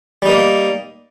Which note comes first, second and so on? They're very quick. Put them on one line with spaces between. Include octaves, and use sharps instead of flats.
G3 D#4 A#3